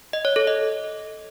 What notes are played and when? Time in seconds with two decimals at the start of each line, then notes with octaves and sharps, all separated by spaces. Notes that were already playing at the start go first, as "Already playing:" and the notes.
0.13 D#5
0.25 C#5
0.36 A4
0.47 D#5